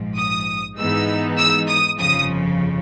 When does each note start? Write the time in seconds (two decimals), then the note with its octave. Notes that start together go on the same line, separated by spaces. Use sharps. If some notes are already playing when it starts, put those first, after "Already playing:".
Already playing: A#1 G#2 F3
0.18 D#6
0.78 G#2 E3 G#3 B3 D#4 E6
1.38 E6
1.69 D#6
1.99 G1 F2 C#3 F3 D#6